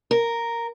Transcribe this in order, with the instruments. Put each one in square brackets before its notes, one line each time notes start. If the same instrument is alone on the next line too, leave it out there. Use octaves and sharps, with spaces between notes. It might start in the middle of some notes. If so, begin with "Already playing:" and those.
[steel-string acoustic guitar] A#4